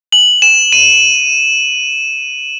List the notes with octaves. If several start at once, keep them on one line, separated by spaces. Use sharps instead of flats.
F#7
E7
D#7